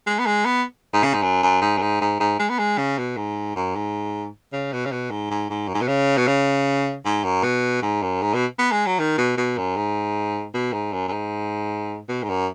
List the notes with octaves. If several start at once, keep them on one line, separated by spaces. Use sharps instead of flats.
G#3
B3
G#3
B3
G#2
C#3
G#2
F#2
F#2
G#2
F#2
G#2
G#2
G#2
G#3
B3
G#3
C#3
B2
G#2
F#2
G#2
C#3
B2
C#3
B2
G#2
G#2
G#2
F#2
G#2
B2
C#3
B2
C#3
G#2
F#2
B2
G#2
F#2
G#2
B2
B3
G#3
F#3
D#3
B2
B2
F#2
G#2
B2
G#2
F#2
F#2
G#2
B2
G#2
F#2